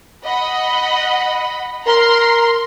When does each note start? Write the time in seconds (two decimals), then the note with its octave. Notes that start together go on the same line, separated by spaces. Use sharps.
0.25 D#5 F#5 B5
1.86 A#4 A#5 C6